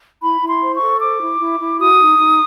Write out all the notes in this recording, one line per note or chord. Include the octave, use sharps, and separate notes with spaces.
E4 B5
E4
C6
C5
C#6
A4
C5 D6
E4
E4
E4
F#4 D#6
D#4
D#4